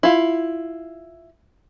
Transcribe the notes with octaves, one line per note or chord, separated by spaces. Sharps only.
E4 F4